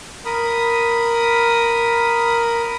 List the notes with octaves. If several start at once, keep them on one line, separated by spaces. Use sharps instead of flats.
A#4 B5 D#6